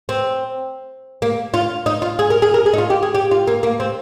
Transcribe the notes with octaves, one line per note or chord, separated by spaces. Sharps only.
C4
A#3
F4
D#4
F4
G#4
A#4
G#4
A#4
G#4
D#4
F4
G4
G#4
G4
F4
A#3
A#3
C4